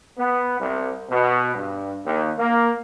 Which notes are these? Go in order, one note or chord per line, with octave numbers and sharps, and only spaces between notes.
B3
C2
B2
G2
D#2
A#3